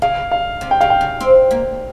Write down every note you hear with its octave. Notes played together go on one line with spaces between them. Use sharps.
C#3 F5
F5
C3
G5
C#3 F5
G5
C#3
C4
A#3